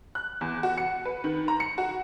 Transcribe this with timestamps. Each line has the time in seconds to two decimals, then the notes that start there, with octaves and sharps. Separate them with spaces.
0.15 F#6
0.41 E2
0.63 F#4
0.78 C#7
1.05 B4
1.24 D#3
1.48 A#5
1.60 C#7
1.78 F#4